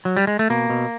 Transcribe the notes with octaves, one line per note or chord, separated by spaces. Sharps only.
F#3
G3
G#3
A3
B2 A#3
B2